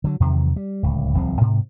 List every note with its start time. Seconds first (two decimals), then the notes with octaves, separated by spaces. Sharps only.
0.04 D3 F#3
0.20 E2 C3 D#3 F#3
0.56 G3
0.83 D1 C#2
1.14 D1 C2 F3 C4
1.41 G#2 C3